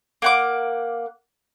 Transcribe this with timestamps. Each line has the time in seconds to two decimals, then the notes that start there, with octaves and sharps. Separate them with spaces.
0.22 A#3 F#5 D6